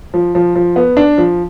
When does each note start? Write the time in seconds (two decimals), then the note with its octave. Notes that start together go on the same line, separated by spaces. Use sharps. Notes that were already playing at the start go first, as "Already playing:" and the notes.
0.14 F3
0.35 F3
0.56 F3
0.76 B3
0.97 D4
1.18 F3